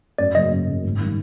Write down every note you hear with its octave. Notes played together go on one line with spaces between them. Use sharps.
F#2 D5
C#3 F#3 A#3 D#5
F#2
C#3 F#3 A#3
G#1
D#3 G3